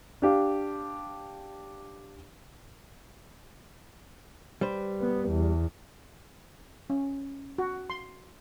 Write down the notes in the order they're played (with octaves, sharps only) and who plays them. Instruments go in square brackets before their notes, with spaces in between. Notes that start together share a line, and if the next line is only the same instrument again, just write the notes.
[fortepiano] D4 G4 F5
[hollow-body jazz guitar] G3 B4 C5
[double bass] B3
E2
[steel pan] C#4
F#4
C6